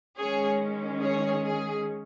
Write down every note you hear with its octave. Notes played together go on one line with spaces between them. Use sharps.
D#3 G#3 C#4 G#4 C#5
G#4 C#5
G#4